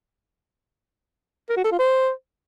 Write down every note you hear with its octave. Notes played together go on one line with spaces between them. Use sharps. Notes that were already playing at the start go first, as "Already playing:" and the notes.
A#4
F#4
A4
F4
C5